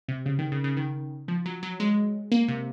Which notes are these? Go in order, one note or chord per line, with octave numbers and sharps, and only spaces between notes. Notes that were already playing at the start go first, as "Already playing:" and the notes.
C3
C#3
D#3
C#3
C#3
D#3
F3
F#3
F#3
G#3
A#3
C3